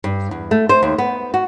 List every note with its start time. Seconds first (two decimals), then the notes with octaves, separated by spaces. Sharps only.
0.04 G2
0.31 E2
0.51 A3
0.69 C5
0.83 D#2
0.98 B3
1.34 F#4